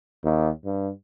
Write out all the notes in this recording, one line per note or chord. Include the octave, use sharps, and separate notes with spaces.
D#2
G2